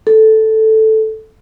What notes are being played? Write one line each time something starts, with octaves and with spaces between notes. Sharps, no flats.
A4